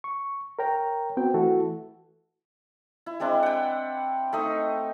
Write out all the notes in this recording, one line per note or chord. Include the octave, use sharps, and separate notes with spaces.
C#6
A#4 C#5 G5 A#5
B3 C4 F#4 G5
E3 A3 E4 F#4 A4
E4
G#3 C4 D4 E4
F#5 G5
A3 D#4 D#5